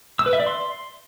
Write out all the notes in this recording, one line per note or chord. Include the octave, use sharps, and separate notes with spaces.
E6
B4
E5
D5
C6